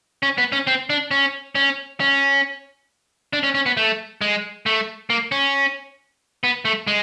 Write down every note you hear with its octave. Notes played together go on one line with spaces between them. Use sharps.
C#4
B3
C#4
C4
D4
C#4
C#4
C#4
D4
C#4
C#4
B3
A3
G#3
A3
A#3
C#4
B3
A3
G#3